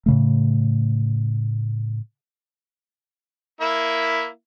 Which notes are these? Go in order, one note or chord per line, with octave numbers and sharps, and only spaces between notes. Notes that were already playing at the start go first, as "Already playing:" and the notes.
A2 C#3 A3
A#3 E4 E5